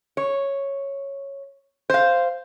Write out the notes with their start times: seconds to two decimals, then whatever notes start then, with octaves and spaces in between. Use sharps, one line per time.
0.17 C#5
1.90 C5 F5